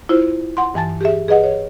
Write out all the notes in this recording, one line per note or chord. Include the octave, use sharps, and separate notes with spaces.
E4 F4 C5
F#5 C6
G2 E3 G#5 A5 A6
G4 G#4 E5
G#4 B4 D#5 F#5
C#5